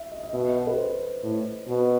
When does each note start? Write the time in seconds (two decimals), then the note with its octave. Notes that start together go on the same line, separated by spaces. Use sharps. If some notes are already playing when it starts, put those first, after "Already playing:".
Already playing: E5
0.12 D#5
0.23 D#5
0.33 B2 E5
0.56 D#5
0.67 B4
0.78 C5
1.24 A2
1.68 B2